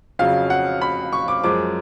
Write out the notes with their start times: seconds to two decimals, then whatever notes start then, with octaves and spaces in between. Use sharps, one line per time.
0.19 F2 C#3 F#3 C#4 F5
0.50 F#5
0.81 B5
1.12 C#6
1.28 D6
1.44 F#2 F3 G#3 D6